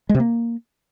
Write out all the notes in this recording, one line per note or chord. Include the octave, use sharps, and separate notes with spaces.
G#3
C3
A#3